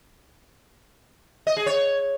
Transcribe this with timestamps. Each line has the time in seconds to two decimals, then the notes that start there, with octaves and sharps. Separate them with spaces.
1.47 D#5
1.57 G#4
1.66 C#5